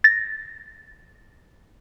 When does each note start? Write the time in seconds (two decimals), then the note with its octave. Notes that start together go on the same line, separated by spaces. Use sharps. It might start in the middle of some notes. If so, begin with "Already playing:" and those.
0.04 A6 A#6